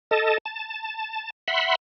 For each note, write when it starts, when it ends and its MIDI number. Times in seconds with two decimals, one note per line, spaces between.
0.11 0.38 69
0.11 0.38 75
0.11 0.38 81
0.46 1.30 81
1.48 1.75 76
1.48 1.75 78
1.48 1.75 83
1.48 1.75 84